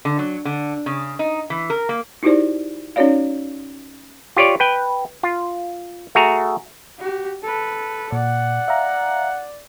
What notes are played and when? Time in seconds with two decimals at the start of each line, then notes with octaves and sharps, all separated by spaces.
0.05 D3
0.19 F#3
0.45 D3
0.86 C#3
1.19 D#4
1.50 E3
1.70 A#4
1.89 A#3
2.23 D#4 E4 F#4 G4 C5 D5
2.96 C#4 D#4 F#4 C#5 D5 F5
4.36 F4 G4 C#5 D5
4.60 B4 G5
5.23 F4
6.15 A3 F#4 G#4 A#5
6.98 F#4 G4
7.43 A4 B4
8.12 A#2 D5 F#5
8.68 E5 F5 A#5